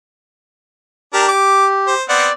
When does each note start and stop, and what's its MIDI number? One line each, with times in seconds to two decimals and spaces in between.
1.14 1.28 62
1.14 1.94 67
1.14 1.28 70
1.28 1.66 86
1.87 2.03 72
2.09 2.28 59
2.09 2.28 60
2.09 2.33 74
2.09 2.28 78